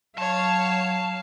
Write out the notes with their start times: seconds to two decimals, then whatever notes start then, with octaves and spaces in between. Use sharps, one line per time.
0.18 F#3 C#5 F5 A5